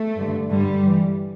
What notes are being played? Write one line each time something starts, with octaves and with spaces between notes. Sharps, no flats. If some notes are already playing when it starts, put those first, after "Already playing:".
Already playing: A3
G2 D3
G2 D3 G3
G2 E3